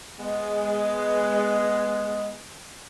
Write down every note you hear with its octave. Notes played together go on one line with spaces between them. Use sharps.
G#3 B3